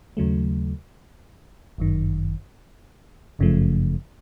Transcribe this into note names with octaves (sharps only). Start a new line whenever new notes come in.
D#2 C#3 F#3 A3
G1 F#2 D#3
G1 F#2 C#3 F3 A3